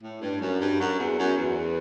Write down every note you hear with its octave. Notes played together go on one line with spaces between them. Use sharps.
A2
G2
F#2
G2
F#2
E2
F#2
E2